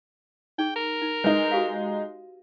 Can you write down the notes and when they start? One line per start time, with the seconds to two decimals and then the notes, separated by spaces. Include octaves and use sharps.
0.58 D#4 G#4 G5
0.76 A#4 G#5
1.02 D#4
1.24 G#3 D#4 B4
1.51 F#4 G4 F5